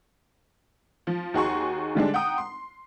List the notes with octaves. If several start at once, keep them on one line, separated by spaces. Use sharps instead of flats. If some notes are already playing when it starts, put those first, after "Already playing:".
F3
D#2 D#4 F#4 G#4 C6 C#6
D3 G3 G#3 D4
F#5 G5 A#5 D#6
C6